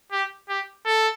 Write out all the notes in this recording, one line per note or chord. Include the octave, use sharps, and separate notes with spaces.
G4
G4
A4